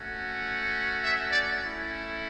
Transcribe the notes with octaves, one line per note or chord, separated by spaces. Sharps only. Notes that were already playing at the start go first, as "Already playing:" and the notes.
Already playing: A3 C#4 F#4
E5
D5
A3 C#4 E4